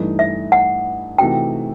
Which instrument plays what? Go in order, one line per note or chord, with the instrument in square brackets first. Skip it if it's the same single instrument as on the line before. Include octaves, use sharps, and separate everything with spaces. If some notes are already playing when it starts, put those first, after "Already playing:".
Already playing: [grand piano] G2 E3 A3 D#4
[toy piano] E5
F#5
[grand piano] C3 E3 A3 D#4 F#4 [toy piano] G5